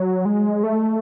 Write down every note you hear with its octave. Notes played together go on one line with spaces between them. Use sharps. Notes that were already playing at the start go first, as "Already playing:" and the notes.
Already playing: F#3
G#3
A3